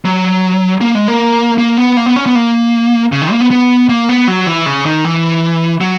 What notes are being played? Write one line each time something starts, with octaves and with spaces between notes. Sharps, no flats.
F#3
A#3
G#3
A#3
A#3
B3
A#3
B3
C#4
B3
A#3
C#3
D#3
A#3
B3
B3
A#3
B3
F#3
E3
C#3
D#3
E3
F#3